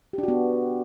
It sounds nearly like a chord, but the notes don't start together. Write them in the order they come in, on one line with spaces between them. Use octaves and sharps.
G4 D4 F#4 B3